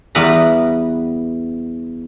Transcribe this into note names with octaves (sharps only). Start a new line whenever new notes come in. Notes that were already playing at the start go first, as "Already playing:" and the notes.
E2 G3 B3 B4 A#5